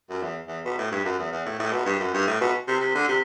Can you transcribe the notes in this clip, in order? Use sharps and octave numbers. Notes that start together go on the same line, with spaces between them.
F#2
E2
E2
B2
A2
G2
F#2
E2
E2
A2
A2
B2
G2
F#2
G2
A2
B2
C3
C3
D3
C3